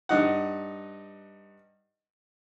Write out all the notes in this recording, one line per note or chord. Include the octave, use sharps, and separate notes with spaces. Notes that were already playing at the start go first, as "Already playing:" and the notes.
G2 D#4 F#5